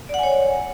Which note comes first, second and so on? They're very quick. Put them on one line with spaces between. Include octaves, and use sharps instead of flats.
D5 F#5 G#5 C#5